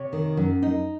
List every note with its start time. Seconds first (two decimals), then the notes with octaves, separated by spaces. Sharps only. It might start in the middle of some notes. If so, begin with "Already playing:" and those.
Already playing: C3 C#5
0.13 D#3
0.37 F#2
0.62 D#4